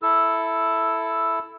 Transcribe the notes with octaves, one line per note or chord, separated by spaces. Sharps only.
E4 A4 E6